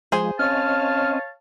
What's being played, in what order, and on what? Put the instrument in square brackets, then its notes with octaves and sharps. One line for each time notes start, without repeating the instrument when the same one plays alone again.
[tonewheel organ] F3 G#3 [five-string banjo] G#4 C5 G#5
[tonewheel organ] C4 C#4 D#5 [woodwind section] C#5 F5 A5 [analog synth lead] F6